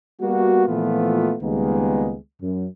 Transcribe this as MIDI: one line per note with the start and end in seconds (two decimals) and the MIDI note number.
0.21 0.66 55
0.21 0.66 58
0.21 0.66 59
0.21 0.66 66
0.67 1.35 46
0.67 1.35 52
0.67 1.35 53
0.67 1.35 57
0.67 1.35 59
0.67 1.35 65
1.42 2.16 37
1.42 2.16 51
1.42 2.16 55
1.42 2.16 56
1.42 2.16 58
1.42 2.16 59
2.42 2.66 42